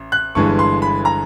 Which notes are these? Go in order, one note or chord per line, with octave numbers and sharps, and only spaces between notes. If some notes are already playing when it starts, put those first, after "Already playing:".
Already playing: A1
F#6
G1 G2 E3 G#3 C#6
C6
B5
A#5